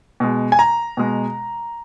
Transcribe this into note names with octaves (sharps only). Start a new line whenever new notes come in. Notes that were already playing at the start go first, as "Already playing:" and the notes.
B2 G#3
G#5
A#5
B2 G#3